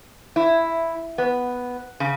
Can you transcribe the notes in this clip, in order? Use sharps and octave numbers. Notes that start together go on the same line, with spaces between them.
E4
B3
C#3